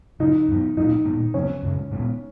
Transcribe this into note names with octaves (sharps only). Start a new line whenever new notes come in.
C#3 F#3 C#4 D#4
F#2 D#3 F#3 B3
A#2 F#3 A#3 C#4 D#4
A#2 G#3 B3
C#3 F#3 B3 C#4
F#2 C#3 G#3
A#2 G#3 B3